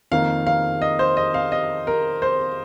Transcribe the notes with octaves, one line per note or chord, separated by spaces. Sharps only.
F2 D#3 A#3 F5
F5
D#5
C5
D#5
F5
D#5
A#4
C5